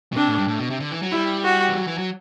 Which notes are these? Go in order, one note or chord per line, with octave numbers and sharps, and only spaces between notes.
B2
C3 D4
A2
G2
A2
B2
C3
D3
E3
F#3
G3 E4
F#4
E3
F#3
E3
F#3